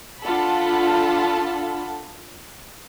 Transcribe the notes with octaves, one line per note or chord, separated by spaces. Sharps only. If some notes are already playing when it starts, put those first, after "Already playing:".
D4 F4 A4 F#5 A5 B5